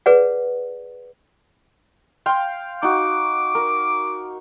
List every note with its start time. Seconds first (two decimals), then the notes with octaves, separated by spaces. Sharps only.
0.06 G#4 B4 D5 F#5
2.26 F5 G5 C6
2.83 D#4 F#4 D6
3.55 A#4